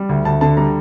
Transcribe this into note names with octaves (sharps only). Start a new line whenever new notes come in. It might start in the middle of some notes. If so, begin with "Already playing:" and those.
Already playing: G3
D2
D2 A5
D3 A5
G3 A#5